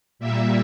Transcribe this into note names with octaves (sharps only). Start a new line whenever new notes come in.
A#2 G3 A#3 E5